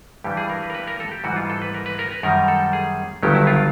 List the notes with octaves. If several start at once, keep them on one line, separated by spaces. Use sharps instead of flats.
G2 E3 G3 G4
G#4
A#4
B4
A#4
B4
A#4
A4
G4
G#2 E3 G3 F#4
F4
A4
B4
A#4
B4
A#4
B4
F#2 D#3 G3 A#4
A4
G#4
G1 G2 D#3 F#3 G4
E4
F4